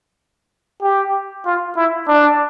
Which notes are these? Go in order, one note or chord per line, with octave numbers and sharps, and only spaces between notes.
G4
F4
E4
D4